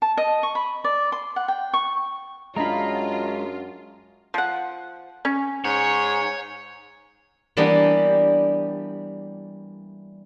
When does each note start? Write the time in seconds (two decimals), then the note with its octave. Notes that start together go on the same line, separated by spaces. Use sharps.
0.02 A5
0.17 D#5
0.43 C#6
0.55 B5
0.84 D5
1.12 C6
1.36 F#5
1.48 G5
1.74 C#6
2.56 F#2 G#3 D4 F4 D#5 A#5 B5
4.34 F3 F#5
5.25 C#4
5.64 G#2 C#5
7.57 E3 G3 A#3 B3 D4 G4